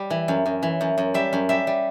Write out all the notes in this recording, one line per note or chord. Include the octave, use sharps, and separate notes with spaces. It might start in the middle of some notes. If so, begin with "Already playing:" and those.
Already playing: G3
E3
F#2
F#2
E3
F#2
F#2
G3 E5
F#2
G3 E5
G3